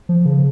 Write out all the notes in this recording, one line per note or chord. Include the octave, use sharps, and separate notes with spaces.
F3
C#3